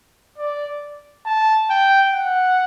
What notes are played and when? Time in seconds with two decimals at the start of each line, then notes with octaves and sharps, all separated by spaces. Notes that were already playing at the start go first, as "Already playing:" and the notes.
0.38 D5
1.26 A5
1.70 G5
2.14 F#5